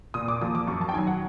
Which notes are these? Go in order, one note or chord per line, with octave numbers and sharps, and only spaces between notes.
A#2 D#6
D6
F3 A#3 D#6
D6
F#2 C#6
A5
G5
D#3 F#3 G#5
F#5